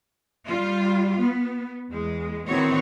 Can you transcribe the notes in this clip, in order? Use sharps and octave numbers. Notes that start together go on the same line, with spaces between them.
G3 F4
B3
E2 G#3
D#3 E3 C4 F#4 C#5